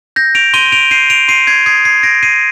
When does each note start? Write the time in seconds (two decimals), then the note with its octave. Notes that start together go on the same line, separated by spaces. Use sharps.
0.16 G6 A#6
0.35 D7 F7
0.54 C6 D#7 G7
0.72 D7 F7
0.91 G6 C7 D#7
1.10 D7 F7
1.28 C6 C7 D#7
1.47 G#6 C7
1.66 D#6 G#6 C7
1.85 G#6 C7
2.03 G6 A#6 D7
2.23 C7 D#7